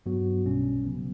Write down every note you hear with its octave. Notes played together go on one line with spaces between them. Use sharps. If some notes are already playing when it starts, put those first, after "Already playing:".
G2 F#3 B3 F#4
B1 B2 G3 C#4
C#3 F#3 B3